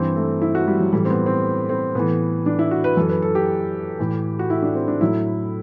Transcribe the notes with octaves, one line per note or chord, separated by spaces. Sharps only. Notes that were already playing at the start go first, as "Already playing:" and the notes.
Already playing: G2 E3 C4
A3
E4
F#4
G3
F#3
A2 E3 G3
C4
B3
C4
C4
A2 E3 B3
D4
E4
F#4
B4
F#2 E3 A4
B4
A4
G4
A2 E3
F#4
E4
D4
C4
D4
A2 F#3 E4